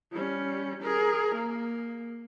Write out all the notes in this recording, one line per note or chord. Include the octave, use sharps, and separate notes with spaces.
G3 C#4
G#4 A#4
A#3